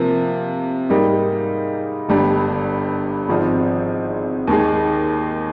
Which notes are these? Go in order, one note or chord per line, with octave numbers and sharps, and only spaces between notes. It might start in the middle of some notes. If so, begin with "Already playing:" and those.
Already playing: C3 F3 A#3
G#2 G3 A#3 D#4
G1 G2 G3
G#1 G#2 F3 C4
D#2 D#3 G#3 D#4 G#4